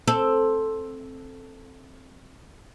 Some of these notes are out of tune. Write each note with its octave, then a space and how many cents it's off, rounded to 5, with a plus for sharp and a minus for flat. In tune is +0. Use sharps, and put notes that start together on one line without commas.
C4 +10 A4 +0